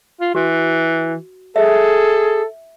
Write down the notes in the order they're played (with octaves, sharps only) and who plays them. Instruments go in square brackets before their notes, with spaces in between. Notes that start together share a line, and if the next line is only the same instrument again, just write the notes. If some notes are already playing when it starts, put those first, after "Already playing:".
[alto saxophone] F4
[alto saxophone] E3 [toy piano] F#4
[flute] G#4 [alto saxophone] A4 [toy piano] E5